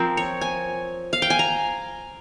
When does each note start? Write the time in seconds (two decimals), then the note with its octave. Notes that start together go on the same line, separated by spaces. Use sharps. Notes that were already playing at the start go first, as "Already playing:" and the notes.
Already playing: F3 C4 A#4
0.17 C#5
0.41 G#5
1.13 F5
1.22 G5
1.30 G#5
1.39 A#5